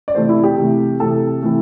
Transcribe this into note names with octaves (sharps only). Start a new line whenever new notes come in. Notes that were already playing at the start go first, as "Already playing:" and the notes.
D5
C3 E3 A3 C5
E4
G4
C3 E3 A3
C3 E3 A3 A4
C3 E3 A3